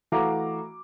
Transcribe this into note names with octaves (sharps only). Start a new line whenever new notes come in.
E3 A3 F#4 F5 A#5 D6